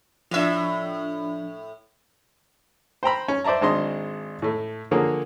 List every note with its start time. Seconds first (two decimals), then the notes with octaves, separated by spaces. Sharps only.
0.31 A2 F3 D4 E5
3.03 C5 G5 A#5 B5
3.28 C#4
3.44 C5 D5 E5 A5 A#5
3.61 G#1 G#3 D4 D#5 C6
4.42 A2 A3
4.91 D3 F3 A#3 G#4 C#5